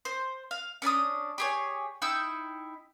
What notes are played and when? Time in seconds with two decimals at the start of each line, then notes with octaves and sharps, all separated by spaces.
0.05 C5
0.51 F5
0.82 C#4 D4 B5 D#6
1.38 G4 G#4 C#5
2.02 D#4 E4 G5 E6